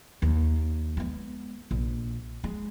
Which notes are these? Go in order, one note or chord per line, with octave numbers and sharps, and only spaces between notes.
D#2
G#3 B3
A#1
G#3